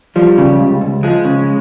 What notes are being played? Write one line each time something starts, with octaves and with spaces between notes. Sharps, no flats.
F3 G3
C#3
C#2
C#2
F3 G#3
C#3